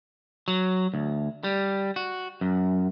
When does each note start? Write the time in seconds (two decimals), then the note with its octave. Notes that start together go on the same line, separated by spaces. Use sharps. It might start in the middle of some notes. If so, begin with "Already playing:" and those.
0.48 F#3
0.94 D2
1.44 G3
1.96 F#4
2.41 F#2